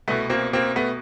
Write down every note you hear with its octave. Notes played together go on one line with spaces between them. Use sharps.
C2 B2 A3 B3
A#3 C4
A#3 C4
A3 B3